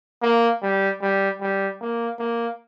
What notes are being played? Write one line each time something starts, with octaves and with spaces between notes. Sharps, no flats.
A#3
G3
G3
G3
A#3
A#3